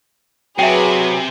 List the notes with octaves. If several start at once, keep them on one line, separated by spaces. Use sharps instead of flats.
C3 F#3 G#4 B4 E5 G5